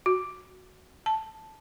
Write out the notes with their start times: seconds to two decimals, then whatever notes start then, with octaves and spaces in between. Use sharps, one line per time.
0.06 F#4
1.06 A5